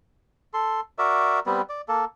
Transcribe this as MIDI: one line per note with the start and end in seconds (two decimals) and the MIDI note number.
0.54 0.80 69
0.54 0.80 84
0.98 1.40 66
0.98 1.40 70
0.98 1.40 74
0.98 1.40 76
1.46 1.62 55
1.46 1.62 59
1.46 1.62 60
1.69 1.81 74
1.88 2.05 58
1.88 2.05 69